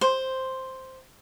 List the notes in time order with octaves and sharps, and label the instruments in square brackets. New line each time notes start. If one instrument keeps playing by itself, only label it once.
[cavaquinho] C5